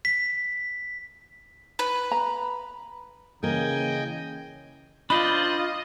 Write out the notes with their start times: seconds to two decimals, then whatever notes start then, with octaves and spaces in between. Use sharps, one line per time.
0.05 B6
1.79 B4
2.12 A#5
3.43 C#3 E3 A#3 A#4 D#5 G5 G#5
5.10 D4 F4 C5 D5 D#5 B5